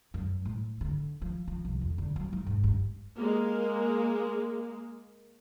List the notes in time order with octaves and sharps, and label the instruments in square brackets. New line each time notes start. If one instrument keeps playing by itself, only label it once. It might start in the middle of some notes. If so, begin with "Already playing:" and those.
[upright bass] F#2
A2
D3
F3
F3
C2
F2
D3
F#3
D#4
G#2
G2
[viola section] G#3 A#3